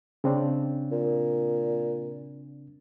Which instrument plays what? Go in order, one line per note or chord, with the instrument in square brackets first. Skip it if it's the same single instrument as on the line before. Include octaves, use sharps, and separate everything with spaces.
[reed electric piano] C#3 C4 D4
[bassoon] A#2